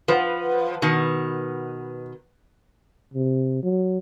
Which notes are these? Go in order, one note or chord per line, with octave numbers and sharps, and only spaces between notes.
F3 B4 F#5
B2 D#3
C3
F#3